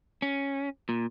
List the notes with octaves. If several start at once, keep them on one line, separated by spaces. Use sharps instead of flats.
C#4
A#2